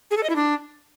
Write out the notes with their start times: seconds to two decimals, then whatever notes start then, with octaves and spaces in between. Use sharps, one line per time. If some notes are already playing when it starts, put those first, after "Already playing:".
0.11 G#4
0.17 A4
0.23 D#5
0.30 E4
0.36 D4